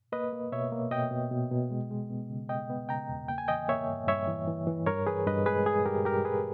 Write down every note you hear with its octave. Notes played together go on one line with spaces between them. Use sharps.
A#3 B4 D#5
A#3
B2 C#5 E5
A#3
B2 D#5 G5
B2
B2
B2
G#3
G#3
B3
C#3
B3 D#5 G5
B3
C#3 G5 A#5
E2
A#3 G5
G#5
E3 D#5 G5
A#3 C#5 E5
G2
G2 C#5 E5
E3
E3
E3
G2 A#4 C#5
E3 G#4 B4
G2 B4 D#5
G#3 G#4 B4
G#3 G#4
G2 G4 A#4
G2 G4 A#4
G2 G#4 B4